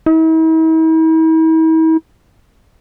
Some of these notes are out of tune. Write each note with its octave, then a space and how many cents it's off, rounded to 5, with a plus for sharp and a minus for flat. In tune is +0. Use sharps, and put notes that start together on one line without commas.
E4 -45